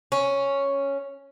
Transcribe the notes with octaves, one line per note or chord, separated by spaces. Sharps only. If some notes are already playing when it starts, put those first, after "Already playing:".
C#4